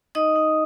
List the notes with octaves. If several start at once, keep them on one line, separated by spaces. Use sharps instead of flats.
D#4 D#5 D#6
D#4